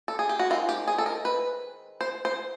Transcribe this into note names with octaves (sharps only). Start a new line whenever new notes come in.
A4
G#4
G4
F#4
D#3 G#3 C4 F4
G4
G#4
A4
A#4
B4
C5
C5